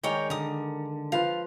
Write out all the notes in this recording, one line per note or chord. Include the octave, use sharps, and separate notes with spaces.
D#3 G#3 A#4 C#5 D5 G5
D3 A#4 D#6
F3 F4 B4 F5